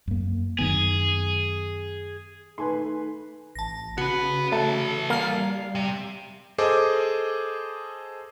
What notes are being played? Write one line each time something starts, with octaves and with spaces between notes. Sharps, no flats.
F#2 A#3
F#2 D#3 B3 G#4
D#3 A3 D#4 B4 G#5 C6
A1 A5 A#6
C#3 B3 F#4 B4
E3 A3 A4
G3 A#3 F5 C7
C3
G#4 A4 C5 D#5 D6